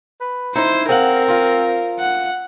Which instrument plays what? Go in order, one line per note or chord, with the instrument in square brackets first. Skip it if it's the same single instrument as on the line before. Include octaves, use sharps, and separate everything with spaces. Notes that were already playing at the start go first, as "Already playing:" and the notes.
[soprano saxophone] B4
[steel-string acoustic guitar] D#4 [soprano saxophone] E4 [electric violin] C5
[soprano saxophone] C4 [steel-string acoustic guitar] G#4 F5 F#5 [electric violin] A#4
[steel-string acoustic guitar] F4 F5
[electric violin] F#5